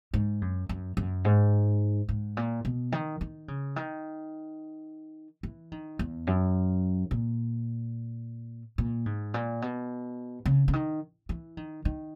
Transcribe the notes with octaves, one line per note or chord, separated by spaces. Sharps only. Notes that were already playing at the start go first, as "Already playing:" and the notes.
G#2
F#2
F#2
F#2
G#2
G#2
A#2
B2
D#3
D#3
C#3
D#3
E3
D#3
E2
F#2
A#2
A#2
G#2
A#2
B2
C#3
C#3
D#3
E3
D#3
D#3